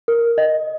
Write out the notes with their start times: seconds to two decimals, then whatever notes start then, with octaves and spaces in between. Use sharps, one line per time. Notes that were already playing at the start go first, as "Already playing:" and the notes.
0.08 A#4
0.38 D#5